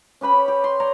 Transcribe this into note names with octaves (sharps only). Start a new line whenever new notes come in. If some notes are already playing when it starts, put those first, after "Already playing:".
C#4 G4 B4 B5
C#4
G4
C6
C#5 D5 A#5